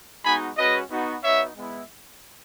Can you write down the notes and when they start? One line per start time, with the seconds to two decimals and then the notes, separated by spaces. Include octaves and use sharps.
0.24 G#3 B3 D#4 F#4 G#5 B5
0.57 G#3 C#4 F#4 B4 D#5
0.90 B3 D#4 F#4
1.23 B3 D#4 F#4 C#5 E5
1.55 G#3 B3 E4